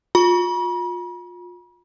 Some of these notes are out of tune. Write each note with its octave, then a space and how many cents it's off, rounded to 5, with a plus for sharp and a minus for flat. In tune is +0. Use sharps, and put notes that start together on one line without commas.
F4 +30 B5 -45